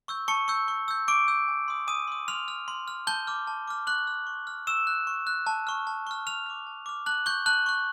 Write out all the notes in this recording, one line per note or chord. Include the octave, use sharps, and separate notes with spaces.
C#6 E6 G6
A5 C#6 C#7
C#6 E6 G6
C#6
E6 G6
C#6 D6 D7
E6 G6
G#5
C6 D#6
G#5 D#6 D#7
C6 D#6
C6 F6 F7
F6
C6
F6
A5 G6 G7
D6 F6
A5
D6 F6
C#6 F#6 F#7
F6
C#6
F6
C#6 E6 E7
F#6
C#6
F#6
A5
C#6 F6
A5
C#6 F6
A5 F6 F7
D6 F6
A5
D6 F6
A5 F#6 F#7
C#6 F#6 G6 G7
A5 F#6 F#7
C#6 F#6